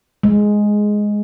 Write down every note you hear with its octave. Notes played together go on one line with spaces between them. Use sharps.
G#3